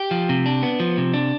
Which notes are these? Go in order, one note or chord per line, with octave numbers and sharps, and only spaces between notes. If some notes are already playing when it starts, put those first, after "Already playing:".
Already playing: G4
F3
C3
D4
B3
F3
C3
D4